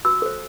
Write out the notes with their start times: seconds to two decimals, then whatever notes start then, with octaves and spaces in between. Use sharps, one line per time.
0.05 F#4 E6
0.22 A4 C5